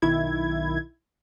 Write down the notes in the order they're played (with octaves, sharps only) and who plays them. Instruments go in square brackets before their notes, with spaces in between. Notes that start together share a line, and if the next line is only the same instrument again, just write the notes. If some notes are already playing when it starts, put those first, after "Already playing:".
[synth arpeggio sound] B1 D#3 E4 G#6